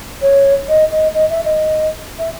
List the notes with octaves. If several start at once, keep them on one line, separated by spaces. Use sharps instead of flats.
C#5
D#5
D#5
D#5
E5
D#5
E5